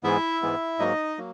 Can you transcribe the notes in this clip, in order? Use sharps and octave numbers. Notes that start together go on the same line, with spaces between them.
G#2 E3 G#3 B3 E4 E5
G#2 E3 G#3 B3
G#2 F#3 A#3 D#4 D#5
F#3 A#3